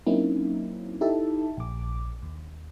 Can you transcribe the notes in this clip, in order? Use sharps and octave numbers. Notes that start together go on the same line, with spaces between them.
F#3 A#3 C4 C#4 D#4 E4
D#4 E4 G4 A4 E5 A5
A#1 D6
D#2